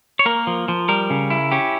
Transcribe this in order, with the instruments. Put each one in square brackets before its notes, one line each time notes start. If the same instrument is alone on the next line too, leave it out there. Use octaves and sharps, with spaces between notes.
[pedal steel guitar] C#5
A#3 A#4
F3
F3
G3 A#4
C#3
E4
C#4 G4